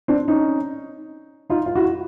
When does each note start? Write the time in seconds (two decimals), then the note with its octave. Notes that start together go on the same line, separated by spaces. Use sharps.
0.08 C4 D4
0.28 C#4 D#4
1.50 D#4 F4
1.66 F4
1.75 E4 F#4